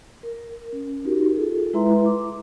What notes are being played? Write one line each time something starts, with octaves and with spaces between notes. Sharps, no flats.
A#4
C#4
D#4 F#4 G4 A#4
F4 G#4 A4
G#3 E4 B4 E5 A#5 C6
D6